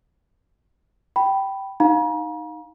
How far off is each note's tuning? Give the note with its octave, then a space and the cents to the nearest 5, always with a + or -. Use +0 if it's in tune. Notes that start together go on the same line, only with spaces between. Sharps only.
G5 -15 B5 +0
D#4 +0 F5 +25 A#5 +40